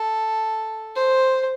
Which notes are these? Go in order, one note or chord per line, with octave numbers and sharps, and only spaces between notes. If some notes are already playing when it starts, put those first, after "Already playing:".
Already playing: A4
C5